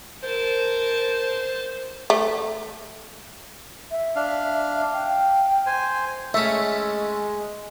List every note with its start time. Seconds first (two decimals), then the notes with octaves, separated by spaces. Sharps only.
0.23 A#4 C5 A5
2.10 A3
3.91 E5
4.16 D4 F5
4.94 F5 G5
5.66 C5 G#5
6.34 G#3 A3 C#4 E5